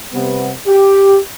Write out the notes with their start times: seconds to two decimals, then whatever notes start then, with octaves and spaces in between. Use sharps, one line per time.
0.12 C3 G3 B3
0.67 G4